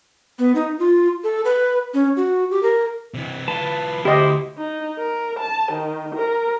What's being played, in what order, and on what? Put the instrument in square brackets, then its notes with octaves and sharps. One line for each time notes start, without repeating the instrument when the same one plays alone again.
[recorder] B3
D#4
F4
A4
B4
C#4
F#4
G4
A#4
[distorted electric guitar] C3 E3
[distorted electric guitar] E3 F4 [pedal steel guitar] B4 A5
[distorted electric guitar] D2 [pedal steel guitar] E4 C5 [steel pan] G4 D#5
[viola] D#4
A#4
A5
D#3
A#4